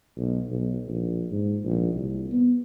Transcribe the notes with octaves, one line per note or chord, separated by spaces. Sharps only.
B1
B1
A#1
G#2
A#1
C2
B3